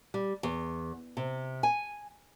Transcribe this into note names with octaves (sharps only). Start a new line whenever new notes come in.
G3
E2
C3
G#5